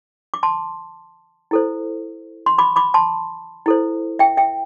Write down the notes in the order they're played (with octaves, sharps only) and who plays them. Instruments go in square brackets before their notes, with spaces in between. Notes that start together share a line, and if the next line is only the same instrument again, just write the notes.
[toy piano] D6
A5 C6
E4 A4 C5
C6
B5 D6
B5 D6
A5 C6
E4 A4 C5
E5 G5
E5 G5